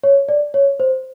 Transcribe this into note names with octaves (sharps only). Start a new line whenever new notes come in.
C#5
D5
C#5
C5